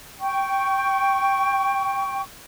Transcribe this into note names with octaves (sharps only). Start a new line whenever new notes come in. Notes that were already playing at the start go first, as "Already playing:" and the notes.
G5 C#6